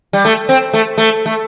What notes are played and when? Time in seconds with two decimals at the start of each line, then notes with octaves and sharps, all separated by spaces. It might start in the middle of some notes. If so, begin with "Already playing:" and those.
0.13 G3
0.25 A3
0.49 C4
0.73 A3
0.98 A3
1.26 A3